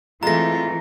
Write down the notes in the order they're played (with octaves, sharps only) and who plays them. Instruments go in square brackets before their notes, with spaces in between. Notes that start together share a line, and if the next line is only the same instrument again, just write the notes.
[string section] E3 [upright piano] G#3 A3 [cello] C4 F4 [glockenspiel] A#5 A#6